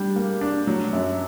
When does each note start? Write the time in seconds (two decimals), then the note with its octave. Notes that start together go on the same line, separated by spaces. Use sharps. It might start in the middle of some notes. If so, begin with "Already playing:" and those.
Already playing: G3 D4
0.16 A#3
0.41 D4
0.67 F#3
0.93 F#2